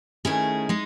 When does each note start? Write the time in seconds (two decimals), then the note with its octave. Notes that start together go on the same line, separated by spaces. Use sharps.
0.25 D#3 A3 C#4 E4 G#4
0.69 G#3 D#4